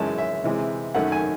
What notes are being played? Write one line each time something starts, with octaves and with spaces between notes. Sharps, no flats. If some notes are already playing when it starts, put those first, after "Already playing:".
Already playing: F#2 E3 G#3 C#4 A5
E5
C3 E3 G#3 C4
F#2 D#3 A3 F#5
G#5